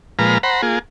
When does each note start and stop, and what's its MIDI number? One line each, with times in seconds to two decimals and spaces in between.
0.19 0.38 46
0.19 0.38 53
0.19 0.38 56
0.19 0.38 71
0.19 0.38 82
0.19 0.38 89
0.43 0.62 72
0.43 0.62 78
0.43 0.62 82
0.43 0.62 83
0.62 0.79 58
0.62 0.79 65
0.62 0.79 68